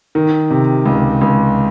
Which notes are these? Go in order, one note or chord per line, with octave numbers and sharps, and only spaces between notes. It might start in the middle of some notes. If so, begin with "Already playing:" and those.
D#3
C3
C#2
C#2